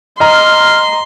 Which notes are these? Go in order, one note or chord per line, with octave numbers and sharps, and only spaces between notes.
D#5 A#5 C6 F6